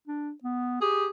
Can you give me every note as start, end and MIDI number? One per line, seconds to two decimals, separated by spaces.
0.08 0.32 62
0.44 0.79 59
0.81 1.09 67
0.81 1.06 68